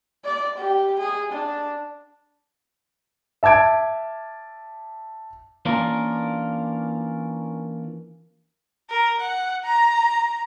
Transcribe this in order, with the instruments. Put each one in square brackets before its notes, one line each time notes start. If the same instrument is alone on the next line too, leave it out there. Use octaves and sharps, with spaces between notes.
[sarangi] D5
G4
G#4
D4
[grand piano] E5 A5 D6 G#6 D7
[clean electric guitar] E3 A#3 C#4 D4 F4 A#4
[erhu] A#4
F#5
A#5